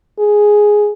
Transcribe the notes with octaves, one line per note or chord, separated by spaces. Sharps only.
G#4